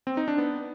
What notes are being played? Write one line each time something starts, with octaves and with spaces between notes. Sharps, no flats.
C4
D#4
D4
B3